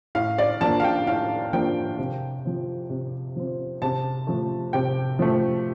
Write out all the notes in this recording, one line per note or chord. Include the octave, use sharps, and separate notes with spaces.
A2 F5
D5
F3 A#3 D4 A5
F5
G5
A2 F5
F3 A#3 D4 G5
C3
F3 C4
C3
F3 C4
C3 A5
F3 A3
C3 G5
F3 A3